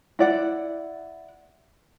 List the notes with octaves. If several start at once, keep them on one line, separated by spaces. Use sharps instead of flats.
E4 D5 F#5